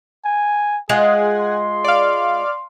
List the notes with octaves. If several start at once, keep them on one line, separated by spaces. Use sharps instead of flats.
G#5
G#3 F4 G#4 F#5 G#5
C6
D5 F5